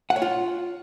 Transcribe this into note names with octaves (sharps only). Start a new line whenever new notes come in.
F#5
C#5
F4